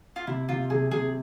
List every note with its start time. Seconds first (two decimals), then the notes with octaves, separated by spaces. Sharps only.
0.16 F4
0.27 C3 E4
0.49 C3 F4
0.70 C3 G#4
0.91 C3 G#4